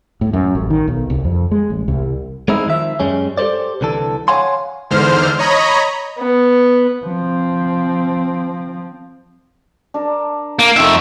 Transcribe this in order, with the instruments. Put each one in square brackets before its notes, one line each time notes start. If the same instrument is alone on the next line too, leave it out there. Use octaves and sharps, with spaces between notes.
[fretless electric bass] A2
F#2
A1
D#3
B1
C2
F2
G#3
A1
C2
[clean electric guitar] G#3 C4 D#4 E4
D#3 F3 E5
F#2 G3 G#3 C#4
G4 A4 B4 C5 D5
C2 D3 E3 A4
C#5 F5 F#5 G#5 C6
[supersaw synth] E2 G#2 D3 C5 F6
C#5 D#5 A#5 B5
[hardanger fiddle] B3
[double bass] F3 C4
[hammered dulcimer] D4 A#4
[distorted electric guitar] A#3
[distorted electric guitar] F2 E5 [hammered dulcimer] A3 C4 D#4